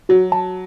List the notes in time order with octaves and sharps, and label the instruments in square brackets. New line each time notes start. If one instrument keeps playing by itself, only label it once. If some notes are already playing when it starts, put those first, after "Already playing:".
[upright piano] F#3 [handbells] F#4
[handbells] A5